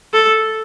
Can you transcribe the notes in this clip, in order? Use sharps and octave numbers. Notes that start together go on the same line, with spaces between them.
A4